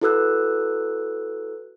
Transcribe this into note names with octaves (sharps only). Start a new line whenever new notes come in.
E4 F#4 A4 B4 E6 F#6